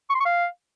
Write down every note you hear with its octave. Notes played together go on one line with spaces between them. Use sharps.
C#6
C6
C#6
F5